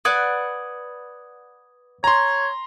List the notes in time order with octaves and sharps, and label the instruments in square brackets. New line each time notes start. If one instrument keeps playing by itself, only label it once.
[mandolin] B4 D5 F#5 [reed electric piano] D#6 G#6
[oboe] C#5 [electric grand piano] A#5 C6